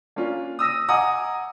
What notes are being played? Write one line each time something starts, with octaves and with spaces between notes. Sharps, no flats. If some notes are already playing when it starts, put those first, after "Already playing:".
A#3 C#4 D4 F4
D#6 E6 A#6 D#7
D#5 F#5 G#5 A#5 D6 D#6